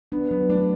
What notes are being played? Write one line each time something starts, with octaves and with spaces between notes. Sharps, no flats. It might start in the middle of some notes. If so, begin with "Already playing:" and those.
B3 D4
F#3 B3
A3 D4